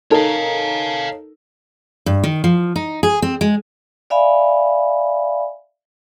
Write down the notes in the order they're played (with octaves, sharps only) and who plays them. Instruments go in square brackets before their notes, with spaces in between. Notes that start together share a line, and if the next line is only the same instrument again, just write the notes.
[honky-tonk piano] D#4 A4 A#4 [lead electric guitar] C#5 F5
[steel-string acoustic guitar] G2
D#3
F3
D#4
G#4
C4
G#3
[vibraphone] D5 E5 F5 G#5 B5